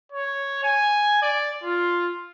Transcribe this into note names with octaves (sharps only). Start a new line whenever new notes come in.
C#5
G#5
D5
F4